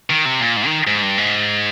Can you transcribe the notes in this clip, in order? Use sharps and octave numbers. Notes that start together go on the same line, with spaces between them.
D#3
C3
A#2
G#2
D#3
G#2
G2
G#2